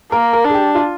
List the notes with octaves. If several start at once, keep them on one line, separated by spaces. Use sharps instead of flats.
A#3 A#4
A#4
D4
G#4
G4
F4